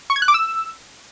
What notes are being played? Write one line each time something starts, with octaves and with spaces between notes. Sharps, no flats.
C#6
G#6
F#6
D6
E6